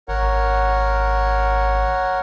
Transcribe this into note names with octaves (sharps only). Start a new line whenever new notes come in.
G#1 A#4 C#5 F#5